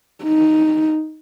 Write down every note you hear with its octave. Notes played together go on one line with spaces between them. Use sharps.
D#4